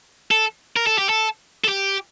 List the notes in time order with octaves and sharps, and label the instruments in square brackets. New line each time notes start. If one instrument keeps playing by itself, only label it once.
[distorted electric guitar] A4
A#4
A4
G4
A4
A4
G4